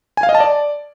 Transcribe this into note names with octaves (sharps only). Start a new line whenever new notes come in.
G#5
F5
D#5
A5
D5